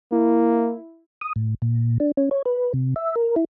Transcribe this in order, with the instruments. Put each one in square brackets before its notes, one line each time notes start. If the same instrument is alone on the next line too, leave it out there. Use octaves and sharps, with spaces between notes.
[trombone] A#3 [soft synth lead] E4
[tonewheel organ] D#6
A2
A#2
D4
C#4
C#5
B4
C3
E5
A#4
E4